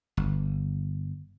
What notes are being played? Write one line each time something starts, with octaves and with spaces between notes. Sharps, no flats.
G1